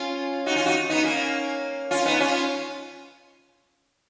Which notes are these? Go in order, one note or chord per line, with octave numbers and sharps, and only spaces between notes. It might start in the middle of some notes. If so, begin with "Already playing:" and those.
Already playing: C#4 F4
D#4 F#4
C#4 F4
D#4 F#4
B3 D#4
A#3 C#4
C#4 F4
B3 D#4
C#4 F4